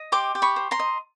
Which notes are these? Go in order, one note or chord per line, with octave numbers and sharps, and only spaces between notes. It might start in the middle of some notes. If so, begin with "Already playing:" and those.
Already playing: D#5
G4 C6 D6
G4
B5 C#6
C5
A#5 C6
D#5